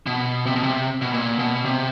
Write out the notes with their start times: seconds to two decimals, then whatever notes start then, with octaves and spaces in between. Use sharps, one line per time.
0.06 B2
0.46 C3
0.56 B2
0.63 C3
1.01 B2
1.13 A#2
1.39 B2
1.65 C3